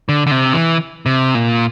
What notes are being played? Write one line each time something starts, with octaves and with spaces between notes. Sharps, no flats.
D3
D3
C3
E3
C3
A#2